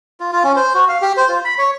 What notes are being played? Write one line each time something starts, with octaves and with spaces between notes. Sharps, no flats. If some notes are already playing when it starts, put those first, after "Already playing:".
F4
F4
C#4
C5
F#4
F5
G4
C5
F4
B5
C#5